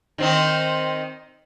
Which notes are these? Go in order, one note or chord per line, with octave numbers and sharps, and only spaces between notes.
D#3 C4 D#4